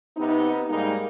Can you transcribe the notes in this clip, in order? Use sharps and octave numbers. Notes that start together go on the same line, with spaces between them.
C3 B3 D#4
G#2 G3 G#3 A#3 D#4